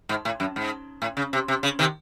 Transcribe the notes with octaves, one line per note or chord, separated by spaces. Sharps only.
G#2
A2
F#2
G#2
A2
C#3
C3
C3
C#3
C3 D#3